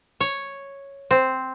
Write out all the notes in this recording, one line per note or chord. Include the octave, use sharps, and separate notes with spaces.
C#5
C4